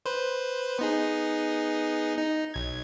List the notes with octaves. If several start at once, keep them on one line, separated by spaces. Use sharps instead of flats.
B4 C5
B3 D#4 G#4
D#4
B1 G#6